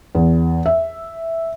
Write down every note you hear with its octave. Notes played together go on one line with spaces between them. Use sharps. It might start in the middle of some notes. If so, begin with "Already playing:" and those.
E2
E5